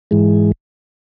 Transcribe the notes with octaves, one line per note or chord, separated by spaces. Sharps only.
G#2 E3 G#3